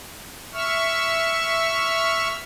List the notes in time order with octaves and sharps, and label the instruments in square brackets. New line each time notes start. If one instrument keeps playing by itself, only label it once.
[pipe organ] E5 C#6 E6 F6